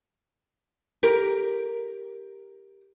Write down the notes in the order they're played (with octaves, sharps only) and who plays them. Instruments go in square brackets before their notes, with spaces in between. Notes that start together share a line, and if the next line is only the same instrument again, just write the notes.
[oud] G4 A#4